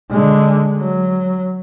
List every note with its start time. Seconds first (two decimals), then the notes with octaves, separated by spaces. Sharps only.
0.11 D3 G#3
0.79 F#3